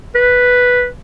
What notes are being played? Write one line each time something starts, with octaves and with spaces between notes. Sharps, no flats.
B4